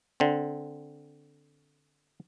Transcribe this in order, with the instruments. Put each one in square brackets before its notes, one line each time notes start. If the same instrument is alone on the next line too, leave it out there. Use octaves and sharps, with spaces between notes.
[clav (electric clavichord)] D3 C4